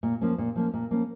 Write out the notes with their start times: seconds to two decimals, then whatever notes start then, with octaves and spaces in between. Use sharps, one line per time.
0.03 A#2
0.21 F3 A#3 C#4
0.38 A#2
0.56 F3 A#3 C#4
0.74 A#2
0.91 F3 A#3 C#4